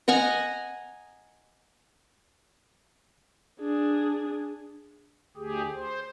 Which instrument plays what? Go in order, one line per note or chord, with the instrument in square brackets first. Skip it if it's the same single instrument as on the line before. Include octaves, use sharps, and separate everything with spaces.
[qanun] D#5 F#5 G#5 A#5
[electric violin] D4 G#4
[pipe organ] D2 G4 G#4
C5